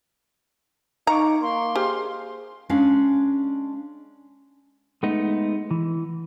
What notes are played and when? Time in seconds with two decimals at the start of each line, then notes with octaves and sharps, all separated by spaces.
1.07 D#4 F5 A#5 C#6 D6
1.42 A#3 C6
1.76 G4 G#4 C5 F5
2.69 G#3 C#4 D4 F5
5.03 G#3 A3 B3 D#4
5.71 E3